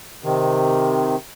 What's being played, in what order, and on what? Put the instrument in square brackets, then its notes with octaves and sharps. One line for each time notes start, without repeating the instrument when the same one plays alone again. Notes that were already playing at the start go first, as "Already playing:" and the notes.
[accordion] C3 D#3